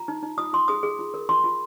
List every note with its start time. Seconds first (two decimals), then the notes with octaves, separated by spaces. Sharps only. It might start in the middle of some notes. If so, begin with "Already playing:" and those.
Already playing: F4 A#5
0.08 D#4
0.23 D#4
0.38 F4 D#6
0.53 F4 C6
0.68 G#4 D#6
0.83 G#4
0.99 F4
1.14 A#4
1.29 F4 C6
1.44 F4